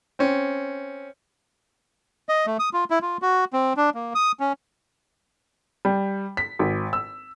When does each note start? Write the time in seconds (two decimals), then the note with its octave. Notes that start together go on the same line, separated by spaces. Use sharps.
0.19 C4 C#4
2.29 D#5
2.46 A3
2.59 D#6
2.73 F4
2.90 E4
3.02 F4
3.22 F#4
3.53 C4
3.77 D4
3.95 A#3
4.15 D#6
4.40 C#4
5.85 G3
6.37 B6
6.59 G#1
6.93 E6